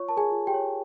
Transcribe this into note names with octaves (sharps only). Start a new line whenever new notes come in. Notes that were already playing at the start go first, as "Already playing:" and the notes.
Already playing: F4 C#5 C#6
A#4 A5
G#4 G#5
F4
G4 G5
C#5